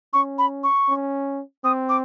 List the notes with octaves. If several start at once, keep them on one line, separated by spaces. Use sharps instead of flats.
C#4 C#6
B5
C#6
C#4
C4 D#6
D6